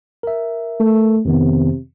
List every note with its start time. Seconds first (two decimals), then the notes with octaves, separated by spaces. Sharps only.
0.23 A#4 E5
0.80 A3
1.25 F2 C3 D#3 B3